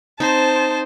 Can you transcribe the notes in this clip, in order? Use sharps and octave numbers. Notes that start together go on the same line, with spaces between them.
C4 D#4 C5 A5